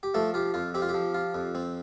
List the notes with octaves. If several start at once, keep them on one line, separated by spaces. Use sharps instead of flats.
G4
F3 A3 A4
F4 G4
F2 F4
C4 G4
F4
G4
F3
F4
F2
C4